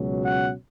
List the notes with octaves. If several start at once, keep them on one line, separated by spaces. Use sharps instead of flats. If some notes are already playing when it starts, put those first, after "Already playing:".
Already playing: C#2 B2 F#3 C#4
F#5